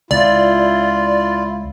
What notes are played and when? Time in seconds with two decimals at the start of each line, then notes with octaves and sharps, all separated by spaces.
0.11 C#2 E4 F4 D5